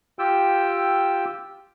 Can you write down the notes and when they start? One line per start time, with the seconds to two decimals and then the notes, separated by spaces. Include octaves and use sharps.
0.19 F4 G4 G5 E6